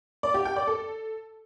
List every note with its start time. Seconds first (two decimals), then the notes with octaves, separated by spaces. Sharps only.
0.23 D5
0.34 G4
0.45 G5
0.56 D5
0.67 A4